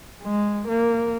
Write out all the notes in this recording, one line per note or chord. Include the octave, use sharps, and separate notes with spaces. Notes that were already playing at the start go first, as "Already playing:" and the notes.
G#3
A#3